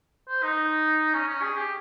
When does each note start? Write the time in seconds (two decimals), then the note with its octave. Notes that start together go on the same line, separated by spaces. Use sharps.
0.28 C5
0.43 D#4
1.14 C#4
1.28 C#4
1.43 G#4
1.57 G4